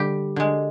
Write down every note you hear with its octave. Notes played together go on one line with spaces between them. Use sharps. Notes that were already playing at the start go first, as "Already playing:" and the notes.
Already playing: D3 G3 G4
D3 G#3